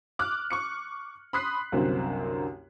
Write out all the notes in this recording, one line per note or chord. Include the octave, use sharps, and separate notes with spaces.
D6 F6 F#6
C#6 D6 C#7
B5 C6 D#6 F#6 B6 C7
C2 F#2 D3 A#3 C4